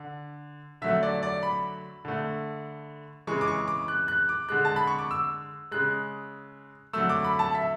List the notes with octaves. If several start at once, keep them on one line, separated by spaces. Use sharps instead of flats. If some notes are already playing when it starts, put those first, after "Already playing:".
Already playing: D3
D3 F#3 A3 E5
D5
D5
B5
D3 A3
C#3 E3 G#3 C#6
D6
C#6
D6
F#6
F#6
D6
D3 G#3 F#6
A5
B5
C#6
D6
E6
C#3 G#3 F#6
D3 F#3 A3 E6
D6
B5
A5
E5